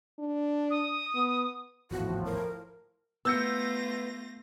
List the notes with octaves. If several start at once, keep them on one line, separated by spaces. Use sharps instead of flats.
D4
D#6
B3
D1 G#1 E2 A2 F3 F#4
A#4
A3 B3 F4 E6 G6 A#6 C#7